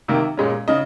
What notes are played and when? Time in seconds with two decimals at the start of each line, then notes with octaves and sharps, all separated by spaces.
0.08 C3 D#3 A#3
0.37 A#2 G#3 C#4
0.68 C#3 D#5